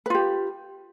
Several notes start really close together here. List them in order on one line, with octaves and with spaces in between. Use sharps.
B4 F4 G4